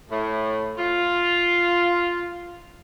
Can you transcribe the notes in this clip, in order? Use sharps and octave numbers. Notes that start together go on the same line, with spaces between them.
A2
F4